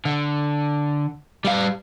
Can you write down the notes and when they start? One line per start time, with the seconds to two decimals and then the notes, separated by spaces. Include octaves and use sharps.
0.05 D3
1.45 G3 F5